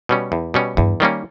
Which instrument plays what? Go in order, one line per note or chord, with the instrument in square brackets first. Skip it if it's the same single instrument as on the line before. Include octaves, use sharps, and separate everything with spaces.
[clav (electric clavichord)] B2 G3 C#4
E2
B2 G3 C#4
[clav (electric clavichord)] E2 [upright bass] G2
[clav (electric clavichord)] D#3 G3 A#3 C#4